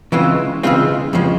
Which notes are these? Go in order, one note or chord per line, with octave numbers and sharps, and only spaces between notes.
C#3 E3 G#3 C4 F4
C#3 E3 G#3 C4 F4
F2 C#3 F3 G#3